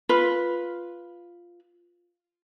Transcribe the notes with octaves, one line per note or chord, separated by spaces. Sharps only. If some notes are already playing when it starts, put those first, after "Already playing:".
F4 B4